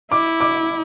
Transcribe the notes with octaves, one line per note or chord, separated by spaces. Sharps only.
E4 D6
D6